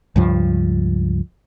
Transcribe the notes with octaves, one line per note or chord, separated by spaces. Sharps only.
C#2 G2 F3